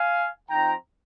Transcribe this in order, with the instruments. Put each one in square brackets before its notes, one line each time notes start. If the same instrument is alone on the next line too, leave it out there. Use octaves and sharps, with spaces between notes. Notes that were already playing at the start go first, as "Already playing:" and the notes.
Already playing: [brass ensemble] F5 G#5
F3 C4 D#4 G5 A#5